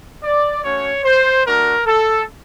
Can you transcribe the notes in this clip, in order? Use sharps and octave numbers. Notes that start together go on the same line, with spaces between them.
D5
A3 C#4 F#4 C#5
C5
A3 D4 F#4 A#4
A4